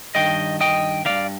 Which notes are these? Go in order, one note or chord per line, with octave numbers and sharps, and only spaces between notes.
G2 D#3 D#5 G5
D#5 G5
G2 D#3 D5 F5